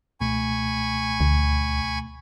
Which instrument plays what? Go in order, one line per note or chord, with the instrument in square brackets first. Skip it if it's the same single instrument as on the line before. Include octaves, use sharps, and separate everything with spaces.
[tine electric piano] C#2 B2 A3 [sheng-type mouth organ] G#5 B5 C#6
[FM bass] D2